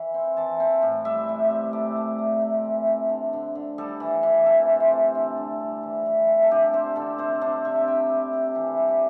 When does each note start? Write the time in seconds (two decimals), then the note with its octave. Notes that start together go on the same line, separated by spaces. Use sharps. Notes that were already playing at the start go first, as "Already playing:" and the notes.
Already playing: E3 E4
0.14 C4
0.37 E3 A5
0.60 C4
0.82 A2
1.05 G3 E5
1.29 C3
1.50 C3
1.73 A3 D5
1.97 A3
2.18 A3
2.41 C3
2.65 E3
2.87 C3
3.09 D3
3.33 D3
3.55 D3
3.78 G3 A4
4.00 E3
4.23 E3
4.46 C3 A4
4.69 C3
4.80 C5
4.92 A3
5.15 D3
5.37 D3
5.60 G3
5.83 E3
6.06 E3
6.28 C3
6.43 A4
6.51 D3 G4
6.73 C4 C5
6.96 D3 A4
7.18 C3 C5
7.41 D4 C5
7.65 C3 E5
7.88 E4 G5
8.09 C3
8.33 C3
8.55 E3 G5
8.77 G3
8.89 G4